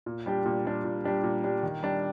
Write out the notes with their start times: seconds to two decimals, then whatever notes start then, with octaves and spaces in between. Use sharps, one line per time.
0.06 A#2
0.26 G3 D4 G4
0.45 A#2
0.65 G3 D4 G4
0.84 A#2
1.04 G3 D4 G4
1.23 A#2
1.44 G3 D4 G4
1.63 D#3
1.83 G3 D4